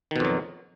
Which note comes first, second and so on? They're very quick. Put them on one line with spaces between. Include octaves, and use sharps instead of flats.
D#3 B2 F2 F#3